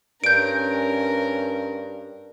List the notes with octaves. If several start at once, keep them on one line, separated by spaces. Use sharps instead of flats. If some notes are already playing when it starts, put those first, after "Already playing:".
G2 C#4 A#4 G6 D7